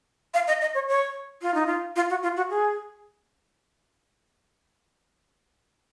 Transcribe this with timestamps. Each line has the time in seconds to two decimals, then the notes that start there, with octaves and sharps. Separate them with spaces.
0.34 F5
0.47 D#5
0.61 D#5
0.74 C#5
0.89 C#5
1.42 F4
1.54 D#4
1.66 F4
1.96 F4
2.10 F#4
2.23 F4
2.37 F#4
2.50 G#4